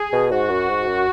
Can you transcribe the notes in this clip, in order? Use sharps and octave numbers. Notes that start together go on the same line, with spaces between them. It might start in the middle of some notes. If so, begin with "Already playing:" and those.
Already playing: G#4
B2
G#2 F#4
F#2
G#2
F#2